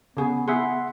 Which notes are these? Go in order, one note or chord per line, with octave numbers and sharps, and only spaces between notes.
C#3 B3 G#4
B3 E4 G#4 E5 F#5 C6